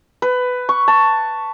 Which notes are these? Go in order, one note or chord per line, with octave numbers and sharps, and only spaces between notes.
B4
C#6
A5